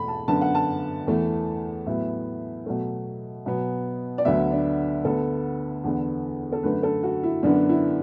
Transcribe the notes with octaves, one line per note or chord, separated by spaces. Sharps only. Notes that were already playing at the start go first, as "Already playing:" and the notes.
Already playing: E2 B2 A3 B5
A5
F#2 D3 B3 A5
F#5
A5
E2 E3 A3
A2 F#3 B3 E5
B2 F#3 A3
B2 F#3 B3
D5
D2 D3 F#3 B3 E5
D4
D2 D3 B3 A4
E2 D3 B3
A4
F#2 D3 A3 B4
A4
F#4
E4
F#2 D3 B3 D4
E4